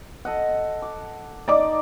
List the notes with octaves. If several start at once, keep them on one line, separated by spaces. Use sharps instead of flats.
A4 D#5 F#5
D6
D#4 D5 D#5 D6